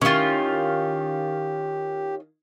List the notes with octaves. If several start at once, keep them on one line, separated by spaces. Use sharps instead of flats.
D#3 C#4 E4 F4 G4